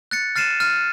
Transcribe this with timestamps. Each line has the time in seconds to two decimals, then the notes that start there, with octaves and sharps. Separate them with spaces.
0.11 F#6 A6 C#7
0.36 F6 A6 C7 D#7 E7
0.60 F6 A6 D#7